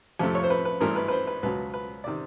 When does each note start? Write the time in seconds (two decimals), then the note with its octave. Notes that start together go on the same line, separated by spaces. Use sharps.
0.19 F2 C3 F3 A3
0.35 C#5
0.44 C5
0.50 B4
0.65 B4
0.81 G#1 G2 E3 A3 A#4
0.96 B4
1.08 B4
1.12 C5
1.27 B4
1.43 C#2 B2 F#3 B4
1.74 B4
2.04 C3 D#3 D5